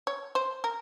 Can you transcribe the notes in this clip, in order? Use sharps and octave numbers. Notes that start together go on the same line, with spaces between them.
C#5
C5
A#4